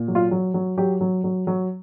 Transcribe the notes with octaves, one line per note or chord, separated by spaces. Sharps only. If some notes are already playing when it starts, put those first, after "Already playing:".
Already playing: A#2
F#3
F4
F#3
F#3
F#3 G4
F#3
F#3
F#3